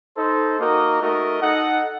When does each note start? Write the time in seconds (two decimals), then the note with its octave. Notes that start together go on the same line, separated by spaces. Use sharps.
0.16 D#4 A4 C5
0.58 A#3 D#4 F#4 A#4 D#5
1.00 A3 D#4 F#4 A#4 D#5
1.41 D#4 A4 D#5 F#5